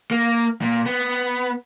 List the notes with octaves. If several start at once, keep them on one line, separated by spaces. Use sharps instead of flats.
A#3
A#2
B3